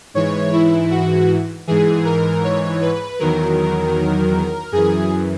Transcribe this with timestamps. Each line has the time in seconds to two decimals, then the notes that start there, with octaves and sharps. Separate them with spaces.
0.14 G#2 E3 C#5
0.53 E4
0.91 F#4
1.67 G#2 E3 G#4
2.05 A#4
2.44 C#5
2.81 B4
3.19 E2 D#3 F#3 A#4
4.72 F#2 E3 G#4